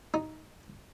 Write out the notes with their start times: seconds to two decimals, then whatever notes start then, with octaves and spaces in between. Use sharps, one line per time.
0.14 D#4